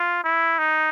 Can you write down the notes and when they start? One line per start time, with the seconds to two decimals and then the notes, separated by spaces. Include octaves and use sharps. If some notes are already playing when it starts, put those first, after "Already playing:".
Already playing: F4
0.24 E4
0.58 D#4